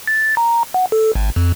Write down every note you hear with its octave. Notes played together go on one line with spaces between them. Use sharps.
A6
A#5
F#5
A4
G#1
F2